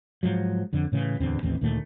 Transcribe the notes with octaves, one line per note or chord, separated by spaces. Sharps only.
G#2 F3 F#3
F2 D3
A2 C#3 E3
D1 E2 D3 C4
A1 D#2 E3 C4
D2 A#2 D#3 A3